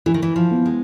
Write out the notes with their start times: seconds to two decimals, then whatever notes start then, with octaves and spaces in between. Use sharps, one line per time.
0.06 E3 E4
0.14 D#3
0.22 E3
0.36 F3
0.51 B3
0.66 G#3